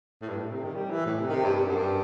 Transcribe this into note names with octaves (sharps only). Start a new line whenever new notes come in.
A2
G2
A2
C3
D#3
G3
E3
A2
C3
D#3
C3
G2
G2
F#2
G2